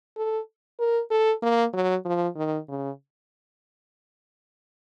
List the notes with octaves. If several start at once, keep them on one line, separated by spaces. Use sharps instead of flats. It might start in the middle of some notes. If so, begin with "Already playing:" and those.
A4
A#4
A4
A#3
F#3
F3
D#3
C#3